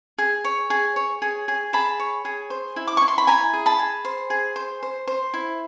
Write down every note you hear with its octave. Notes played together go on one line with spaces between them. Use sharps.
G#4
C#5
G#4
C#5
G#4
G#4
G#4 A5 B5
C#5
G#4
C5
E4
D6
E4 C#6
C6
B5
E4 G#5 A#5
G#4
A5 B5
G#4
C5
G#4
C5
C5
C5
E4